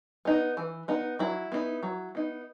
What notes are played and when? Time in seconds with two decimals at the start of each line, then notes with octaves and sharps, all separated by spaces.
0.25 B3 D#4
0.57 E3
0.88 B3 D#4
1.19 F#3 E4
1.52 B3 D#4
1.83 F#3
2.15 B3 D#4